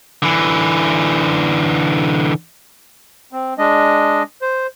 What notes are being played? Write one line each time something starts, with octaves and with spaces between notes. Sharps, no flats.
D3 E3
C4
G#3 D4 D#5
C5